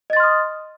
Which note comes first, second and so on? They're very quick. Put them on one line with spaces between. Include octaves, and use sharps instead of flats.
D#5 A6 C6 F6 D#6